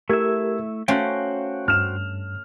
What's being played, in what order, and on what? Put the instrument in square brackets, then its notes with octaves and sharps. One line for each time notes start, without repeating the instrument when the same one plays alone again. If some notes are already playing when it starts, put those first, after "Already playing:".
[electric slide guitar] A3 E4 E5 [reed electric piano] G4 A#4 G#6
[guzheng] A3 C#4 [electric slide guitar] F#4 C5 G5 [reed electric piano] F5
[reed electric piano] G2 [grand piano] F6 E7